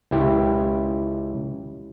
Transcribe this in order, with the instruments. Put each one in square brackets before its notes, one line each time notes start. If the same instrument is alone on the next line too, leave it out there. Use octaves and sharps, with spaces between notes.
[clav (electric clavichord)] C#2 E4 G4